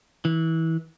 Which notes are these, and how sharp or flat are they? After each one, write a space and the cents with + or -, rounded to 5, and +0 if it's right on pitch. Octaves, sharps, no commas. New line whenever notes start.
E3 -25